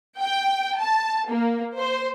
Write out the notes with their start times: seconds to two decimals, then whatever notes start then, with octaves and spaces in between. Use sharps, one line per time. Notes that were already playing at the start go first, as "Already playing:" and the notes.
0.20 G5
0.80 A5
1.30 A#3
1.77 C5